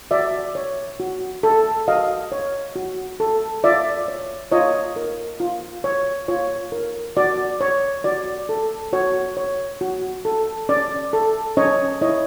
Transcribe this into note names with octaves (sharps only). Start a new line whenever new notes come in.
F#4 D5 E5
C#5
F#4
A4
F#4 D#5 F5
C#5
F#4
A4
F4 D5 E5
C#5
F4 C#5 D#5
A#4
F4
C#5
F4 C#5
A#4
F#4 D5
C#5
F#4 D5
A4
F#4 C#5
C#5
F#4
A4
C#4 D5
A4
C#4 C#5 D#5
E4 C#5 D#5